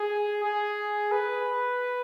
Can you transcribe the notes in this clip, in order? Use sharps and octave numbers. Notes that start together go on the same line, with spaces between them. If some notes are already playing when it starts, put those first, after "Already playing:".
Already playing: G#4
G#4
B4